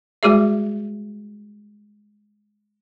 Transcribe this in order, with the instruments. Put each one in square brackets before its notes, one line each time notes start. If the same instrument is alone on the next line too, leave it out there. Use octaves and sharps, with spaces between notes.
[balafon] G3 G#3 F#4 G#4 E5